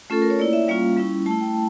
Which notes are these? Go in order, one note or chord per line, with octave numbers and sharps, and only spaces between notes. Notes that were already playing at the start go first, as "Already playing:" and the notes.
A3 C#4 F4 A4
A#4
C#5
A#3 E4 D5
E5
G3 A#3 C#4 F4 F5
G3 C#4 E4
A3 E4 A5
G5